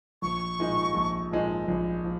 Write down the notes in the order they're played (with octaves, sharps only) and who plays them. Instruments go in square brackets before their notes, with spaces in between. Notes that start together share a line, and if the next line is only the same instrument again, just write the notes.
[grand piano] A#1 [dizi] C#6
[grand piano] A#2 F3 G#3 D#4
A#1
A#2 F3 G#3 D#4
A#1
F3